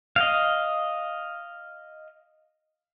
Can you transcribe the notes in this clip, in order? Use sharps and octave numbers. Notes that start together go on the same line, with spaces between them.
D#5 F5